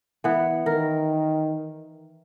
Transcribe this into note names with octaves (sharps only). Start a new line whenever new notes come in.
E3 B3
D#3 A#4